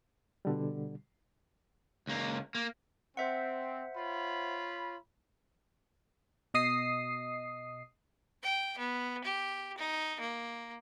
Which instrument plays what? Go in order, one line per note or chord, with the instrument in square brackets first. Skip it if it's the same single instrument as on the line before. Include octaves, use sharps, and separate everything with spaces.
[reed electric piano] B2 D3 G3
[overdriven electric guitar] C#2 A#3
A#3
[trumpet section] C4 [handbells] C5 E5 F#5
[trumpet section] F4 C#5 B5
[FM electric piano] B2 D#5 D#6 C7
[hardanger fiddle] G5
B3
G4
D#4
A#3